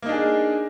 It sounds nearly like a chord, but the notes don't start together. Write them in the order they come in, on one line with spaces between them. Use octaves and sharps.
A#3 D#4 D4 G#4